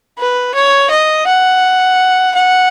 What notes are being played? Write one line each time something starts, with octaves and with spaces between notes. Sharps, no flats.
B4
C#5
D#5
F#5
F#5